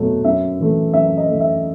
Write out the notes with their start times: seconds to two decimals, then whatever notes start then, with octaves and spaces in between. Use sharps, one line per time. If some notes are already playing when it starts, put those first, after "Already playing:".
Already playing: B2 F#3 A3
0.25 F#2 E5
0.60 E3 A3
0.94 F#2 E5
1.17 D#5
1.28 E3 A3
1.41 E5